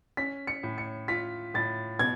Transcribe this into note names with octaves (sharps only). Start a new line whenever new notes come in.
C#4 B6
C#7
A2
C#7
F4 B6
A2 A6
B2 G#6